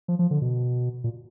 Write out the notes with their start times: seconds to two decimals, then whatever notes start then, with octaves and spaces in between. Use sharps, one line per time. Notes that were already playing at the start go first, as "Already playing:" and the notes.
0.08 F3
0.19 F3
0.31 D3
0.41 B2
1.04 A#2